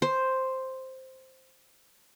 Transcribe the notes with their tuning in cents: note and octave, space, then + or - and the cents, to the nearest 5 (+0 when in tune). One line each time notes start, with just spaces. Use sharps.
C5 +0